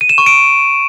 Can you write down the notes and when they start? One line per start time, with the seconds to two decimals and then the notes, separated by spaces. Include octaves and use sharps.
0.01 D#7
0.09 E7
0.18 C#6
0.26 D7